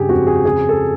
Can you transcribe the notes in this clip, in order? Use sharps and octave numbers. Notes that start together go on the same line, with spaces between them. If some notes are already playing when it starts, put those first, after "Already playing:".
Already playing: G2 C#3 G4 G#4
F2 F#4
G#4
C#3 G#4
A4